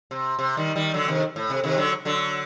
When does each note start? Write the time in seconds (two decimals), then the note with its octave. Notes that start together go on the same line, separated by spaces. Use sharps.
0.11 C3
0.39 C3
0.57 D#3 G3
0.75 D#3 G3
0.94 D3 F#3
1.08 C3 D#3
1.36 A2
1.50 C3
1.64 C3 D#3
1.77 D3 F#3
2.05 D3 F#3